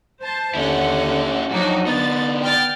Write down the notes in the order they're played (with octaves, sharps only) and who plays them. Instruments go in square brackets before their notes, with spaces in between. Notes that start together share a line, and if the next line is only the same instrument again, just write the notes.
[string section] C5 A5
[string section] D#2 F#5 [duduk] D3 [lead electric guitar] C#4 E4
[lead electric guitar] F2 G#2 [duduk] F#3 [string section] D4 D#4 F#4
[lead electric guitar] D3 D#4 [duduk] B3 [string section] A6
[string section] G5 F6 A6